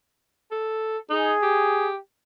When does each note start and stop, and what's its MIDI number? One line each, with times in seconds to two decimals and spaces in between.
0.51 0.98 69
1.10 1.33 63
1.10 1.89 68
1.43 1.97 67